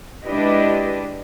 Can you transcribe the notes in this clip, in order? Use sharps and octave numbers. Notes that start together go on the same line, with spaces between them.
G#3 D4 E4 G4 B4 D#5